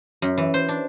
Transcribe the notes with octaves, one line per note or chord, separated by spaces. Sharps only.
F#2
E3
C5
D4